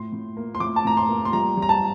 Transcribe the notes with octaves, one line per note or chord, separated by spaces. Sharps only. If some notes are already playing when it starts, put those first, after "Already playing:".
Already playing: A2 C6
A2
A#3
C6
A2 D6
A5
A2 A#5
C6
A#3
C6
G3 A#5
G3
A#5
A5